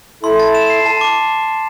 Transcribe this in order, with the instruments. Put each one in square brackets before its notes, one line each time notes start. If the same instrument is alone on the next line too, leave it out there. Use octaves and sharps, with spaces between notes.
[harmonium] E4 A4 [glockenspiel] C6
[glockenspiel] A6
E7
C7
A5
D6